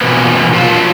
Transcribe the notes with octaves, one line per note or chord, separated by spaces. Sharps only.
B2 E3 F3 A#3 B3
F#3 F4 A#4 F5 A5